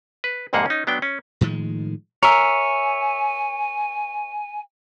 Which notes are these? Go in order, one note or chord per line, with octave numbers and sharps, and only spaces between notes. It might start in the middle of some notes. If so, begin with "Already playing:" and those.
B4
C2 F2 G#2 A#3 G#4 F#5
C#4 D#4
F#3 B3 D4 G5
C#4
A2 D#3 F3 G#3
A#4 C#5 E5 G#5